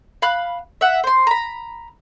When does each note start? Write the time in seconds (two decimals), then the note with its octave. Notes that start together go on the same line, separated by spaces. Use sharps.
0.22 F5 B5 F#6
0.81 E5 F#5
1.04 C5 C6
1.27 A#5 B5